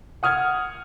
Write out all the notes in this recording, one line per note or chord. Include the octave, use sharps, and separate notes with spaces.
F#5 D#6 F6 G#6